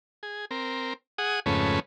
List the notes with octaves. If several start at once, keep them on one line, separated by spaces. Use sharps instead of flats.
G#4
C4 A#4
G#4 F#5 D#6
F2 G#2 C#3 A3 C#4 B4